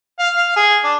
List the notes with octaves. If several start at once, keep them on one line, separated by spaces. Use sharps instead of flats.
F5
F5
G#4
D4